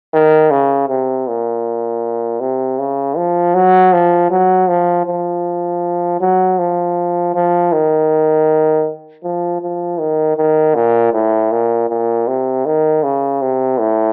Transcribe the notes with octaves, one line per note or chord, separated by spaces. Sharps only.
D#3
C#3
C3
A#2
C3
C#3
F3
F#3
F3
F#3
F3
F3
F#3
F3
F3
D#3
F3
F3
D#3
D#3
A#2
A2
A#2
A#2
C3
D#3
C#3
C3
A2